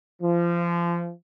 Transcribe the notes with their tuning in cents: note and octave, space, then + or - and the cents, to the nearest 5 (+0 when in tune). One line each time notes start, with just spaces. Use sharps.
F3 -25